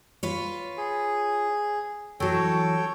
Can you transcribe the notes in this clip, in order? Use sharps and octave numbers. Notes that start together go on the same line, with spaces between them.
F4 B4 C#5
G#4
E3 F#3 A4 C#5 G5